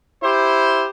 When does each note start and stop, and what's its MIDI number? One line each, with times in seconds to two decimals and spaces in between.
0.23 0.88 64
0.23 0.88 67
0.23 0.88 72